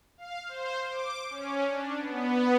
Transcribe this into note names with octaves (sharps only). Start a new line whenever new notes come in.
F5
C5
D6
C#4
D4
B3